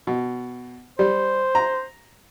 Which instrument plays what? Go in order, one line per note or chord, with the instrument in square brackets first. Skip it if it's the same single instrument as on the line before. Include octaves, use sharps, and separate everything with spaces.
[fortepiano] B2
[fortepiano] G3 [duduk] C5
[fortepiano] A#5